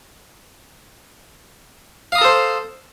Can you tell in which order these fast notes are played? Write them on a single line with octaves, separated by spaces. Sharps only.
F5 D#6 A#5 A4 C5